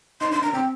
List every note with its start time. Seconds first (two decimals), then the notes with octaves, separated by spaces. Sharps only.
0.21 D#4 C6
0.31 D4 C6
0.42 D4 A#5
0.53 C4 G5